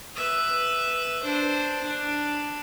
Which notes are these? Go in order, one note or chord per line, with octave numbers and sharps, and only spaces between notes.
B4 E5
D4 C5
D4